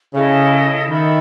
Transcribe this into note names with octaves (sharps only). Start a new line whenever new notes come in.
C#3 E4 A4 D#5
D#3 A4 E5 B5